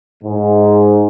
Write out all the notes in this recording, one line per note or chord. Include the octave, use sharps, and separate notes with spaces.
G#2